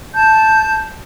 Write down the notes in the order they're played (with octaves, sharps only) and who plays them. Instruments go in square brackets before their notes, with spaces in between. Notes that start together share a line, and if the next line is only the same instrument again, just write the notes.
[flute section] A5 G6